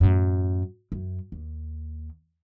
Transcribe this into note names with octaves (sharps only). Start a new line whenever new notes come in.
F#2 A2
F#2
D#2